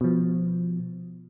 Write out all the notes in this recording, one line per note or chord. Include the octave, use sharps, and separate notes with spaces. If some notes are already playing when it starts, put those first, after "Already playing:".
B2 F3